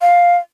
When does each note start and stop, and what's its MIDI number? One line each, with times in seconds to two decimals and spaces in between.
0.01 0.37 77